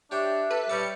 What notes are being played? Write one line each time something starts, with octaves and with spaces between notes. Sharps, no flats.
D4 G4 C#5 E5 G5
A4 B4
G3 C#5 D5 A5 C#7